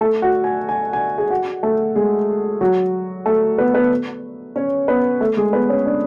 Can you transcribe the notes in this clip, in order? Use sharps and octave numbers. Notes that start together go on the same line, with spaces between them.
A3 A4
F#4 F#5
G#5
G#5
G#5
G#4 G#5
F#4 F#5
A3 A4
G#3 G#4
F#3 F#4
A3 A4
B3 B4
B3 B4
C#4 C#5
B3 B4
A3 A4
G#3 G#4
B3 B4
C#4 C#5
D4 D5